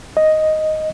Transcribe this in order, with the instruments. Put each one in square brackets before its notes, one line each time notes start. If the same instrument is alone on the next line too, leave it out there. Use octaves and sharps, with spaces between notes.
[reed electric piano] D#5